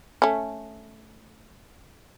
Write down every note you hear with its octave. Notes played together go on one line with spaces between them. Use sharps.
A3 C#4